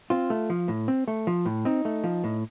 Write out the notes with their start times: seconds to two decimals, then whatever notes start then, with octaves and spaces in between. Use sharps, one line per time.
0.10 C4 F4
0.30 A3
0.50 F3
0.68 A2
0.88 C4
1.08 A3
1.27 F3
1.45 A2
1.65 C4 D#4
1.85 A3
2.04 F3
2.24 A2